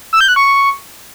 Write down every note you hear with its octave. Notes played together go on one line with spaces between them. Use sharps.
E6
G6
F#6
C#6